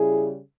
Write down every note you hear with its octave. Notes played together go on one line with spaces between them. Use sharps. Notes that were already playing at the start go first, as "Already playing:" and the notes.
Already playing: C#3 G3 E4 G#4